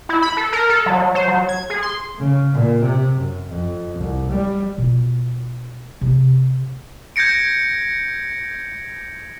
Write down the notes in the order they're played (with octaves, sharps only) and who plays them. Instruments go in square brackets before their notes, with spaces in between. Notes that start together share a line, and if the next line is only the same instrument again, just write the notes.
[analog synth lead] E4
B5
A4
A#4
A4
F#3
F#3
C5
F#3
G#6
G#4
C6
[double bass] C#3
A#2
C3
F#2
F2
C2
G3
[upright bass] B2 F4
C3
[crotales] G6 G#6 A#6 C#7 D7